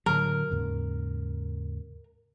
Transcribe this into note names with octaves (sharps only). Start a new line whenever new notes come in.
A2 D3 F#3 A#4
D#2 G#2 C#3